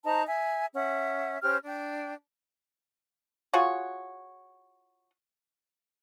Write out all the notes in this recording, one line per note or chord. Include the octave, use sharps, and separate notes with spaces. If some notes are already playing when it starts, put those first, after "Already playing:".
D#4 C5 A5 A#5
E5 G#5
C#4 E5 F#5
C#4 G4 C5 F6
D4 G5
F4 F#4 G#4 C#5